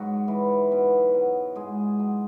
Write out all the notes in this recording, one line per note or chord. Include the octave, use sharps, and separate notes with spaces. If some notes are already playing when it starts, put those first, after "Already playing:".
Already playing: G#2 F#3 F#4
E3
B2
F#3
G#2 G#3 G#4
F#3